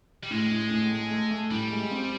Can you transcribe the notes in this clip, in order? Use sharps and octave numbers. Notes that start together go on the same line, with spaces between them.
G3
A2 G#3
A2
A2
A3
A3
A3
A2 G3
G#3
C4